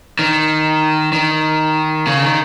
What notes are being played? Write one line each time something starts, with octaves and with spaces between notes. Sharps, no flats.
D#3
D#3
C#3
D#3